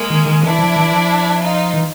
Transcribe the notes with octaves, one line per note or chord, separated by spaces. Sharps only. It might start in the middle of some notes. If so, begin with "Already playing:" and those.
Already playing: G#3 A#3
D#3
D#3
E3 D4 E4
F3
E3
F3
D#4 F4
E3